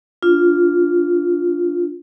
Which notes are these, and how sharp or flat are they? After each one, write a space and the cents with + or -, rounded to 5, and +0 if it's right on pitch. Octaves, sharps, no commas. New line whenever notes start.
D4 -15 F4 +0